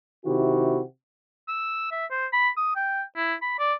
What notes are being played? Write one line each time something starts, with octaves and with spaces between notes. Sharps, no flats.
C3 D#3 E4 F#4 G4
E6
E5
C5
B5
D#6
G5
E4
B5
D5